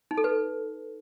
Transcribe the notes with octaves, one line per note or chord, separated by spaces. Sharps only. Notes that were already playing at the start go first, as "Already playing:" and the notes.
D#4
A4
B4